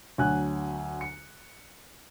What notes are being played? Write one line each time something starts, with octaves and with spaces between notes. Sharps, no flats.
D2 F#3 G#5 F#6
C#7